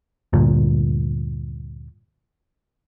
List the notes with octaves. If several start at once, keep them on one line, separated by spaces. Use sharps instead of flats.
D2 G2 A#2